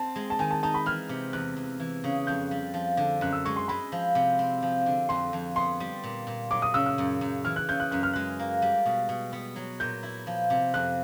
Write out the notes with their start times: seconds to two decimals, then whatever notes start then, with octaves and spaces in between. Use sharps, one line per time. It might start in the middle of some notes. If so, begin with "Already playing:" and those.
Already playing: C4 A5
0.16 G#3
0.30 A5
0.39 D#3 G#5
0.51 A5
0.63 D#4 A5
0.74 B5
0.86 E3 F6
1.09 C3
1.33 E2 F#6
1.57 E2
1.80 E3
2.04 C#3
2.27 F2 G6
2.51 G3
2.74 F3
2.97 D3
3.21 F#2 F#6
3.33 E6
3.45 G#3 C#6
3.56 C6
3.68 G#3 B5
3.92 F3
4.15 C3
4.39 C4
4.62 F3
4.86 D3
5.09 F2 C6
5.33 F2
5.56 B3 C6
5.80 G3
6.04 A#2
6.27 A#2
6.51 F#3 D6
6.62 D#6
6.74 C#3 E6
6.86 E6
6.98 F#2
7.21 F#2
7.45 E3 F6
7.56 F#6
7.69 C#3 G6
7.80 F#6
7.91 F#2 F#6
8.03 F6
8.13 G#3 F#6
8.39 A#3
8.62 G3
8.86 B2
9.09 B2
9.33 B3
9.56 F#3
9.80 A#2 G6
10.03 E4
10.27 F3
10.50 C3
10.74 F2 F#6